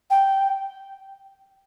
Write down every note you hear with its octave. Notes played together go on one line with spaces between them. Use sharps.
G5